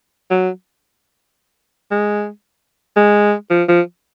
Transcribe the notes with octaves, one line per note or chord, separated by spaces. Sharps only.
F#3
G#3
G#3
F3
F3